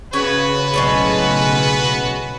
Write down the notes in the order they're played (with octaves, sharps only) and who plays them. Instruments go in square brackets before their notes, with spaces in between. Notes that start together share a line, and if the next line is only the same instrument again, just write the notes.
[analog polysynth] C#3 [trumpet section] B3 F#4 B4 [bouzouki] C#5
[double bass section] B1 A2 [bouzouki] G#3 C#4 A4